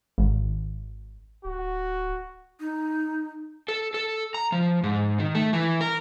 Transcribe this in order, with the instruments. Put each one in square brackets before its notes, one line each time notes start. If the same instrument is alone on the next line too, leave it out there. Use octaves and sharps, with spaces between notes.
[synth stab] G#1
[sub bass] D1 [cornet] F#4
[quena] D#4
[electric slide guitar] A4
A4
A#5
F3
G#2
D#3
A3
E3
A#4